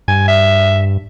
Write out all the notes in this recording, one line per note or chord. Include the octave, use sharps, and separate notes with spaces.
G2 G#5
E5